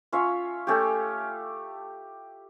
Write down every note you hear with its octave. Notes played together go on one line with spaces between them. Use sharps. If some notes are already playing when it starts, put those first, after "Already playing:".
C#4 F4 C#5 E5
A3 C#4 G4